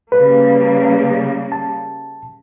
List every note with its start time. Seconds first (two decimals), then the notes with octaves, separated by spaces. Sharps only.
0.12 C#3 G3 A#3 B4
1.52 A5